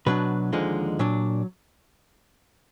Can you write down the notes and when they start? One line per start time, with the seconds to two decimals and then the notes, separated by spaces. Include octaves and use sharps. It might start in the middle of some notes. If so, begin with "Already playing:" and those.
0.06 B2 F#3 D4 B4
0.53 D#2 D3 F3 G#3 D#4
0.99 A#2 F#3 D4